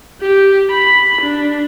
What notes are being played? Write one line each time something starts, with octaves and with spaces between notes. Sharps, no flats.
G4
B5
D4